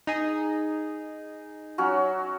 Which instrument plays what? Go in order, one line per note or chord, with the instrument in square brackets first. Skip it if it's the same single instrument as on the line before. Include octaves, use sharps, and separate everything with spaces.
[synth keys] D#4 G#4
[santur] F#3 C#4 F#4